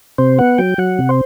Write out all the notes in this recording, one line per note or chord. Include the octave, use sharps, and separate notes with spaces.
C3 C5
B3 F#5
F#3 G5
F#3 F#5
C3
C5